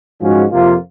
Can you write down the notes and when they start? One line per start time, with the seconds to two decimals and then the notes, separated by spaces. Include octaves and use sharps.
0.20 G#2 F3 G#3 C#4 F#4
0.51 F2 C3 F3 A#3 F4